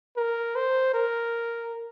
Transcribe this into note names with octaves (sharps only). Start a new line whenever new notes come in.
A#4
C5
A#4